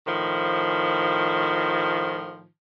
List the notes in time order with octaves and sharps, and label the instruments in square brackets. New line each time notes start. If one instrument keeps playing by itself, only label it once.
[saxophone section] A2 D#3 F3